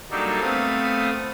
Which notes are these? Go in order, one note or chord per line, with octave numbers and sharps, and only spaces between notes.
F#3 G3 A#3 D4 D#4 A4
A3 B3 C4 F5 D#6